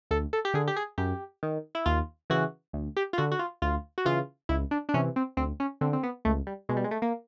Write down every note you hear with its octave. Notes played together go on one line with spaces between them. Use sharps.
D2 A4
A4
G4
D3 G#4
G4
G#4
F#2 G4
D#3
E4
D#2 F4
C#3 E3 F#4
D2
G4
F4
D3 F#4
F#4
F4
D2 F4
F#4
C#3 E3 F4
C#2 E4
D4
D4
C3 E3 C#4
C4
D2 C4
C#4
D3 C4
C4
B3
C#2 A3
G3
B2 G#3
G3
G#3
A3
A#3